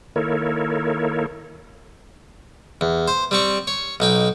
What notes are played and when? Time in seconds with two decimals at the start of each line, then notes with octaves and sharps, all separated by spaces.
0.16 D#3 A#3 E4 A4 A#4 C#5
2.81 E2
3.08 C5
3.31 G3 C4 C#6
3.67 C#5
4.00 B1 D#4 G5